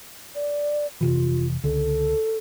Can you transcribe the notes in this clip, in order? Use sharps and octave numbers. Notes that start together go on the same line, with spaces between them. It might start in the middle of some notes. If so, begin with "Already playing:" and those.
D5
F1 C3 E3 F4
C#2 D3 A4